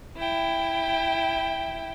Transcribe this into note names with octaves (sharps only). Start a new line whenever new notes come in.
E4 G5